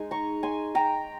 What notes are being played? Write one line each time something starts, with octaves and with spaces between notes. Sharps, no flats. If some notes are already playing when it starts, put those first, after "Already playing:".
Already playing: G#3 D#4 G#5
A#5 C#6
G#5 C6
G5 A#5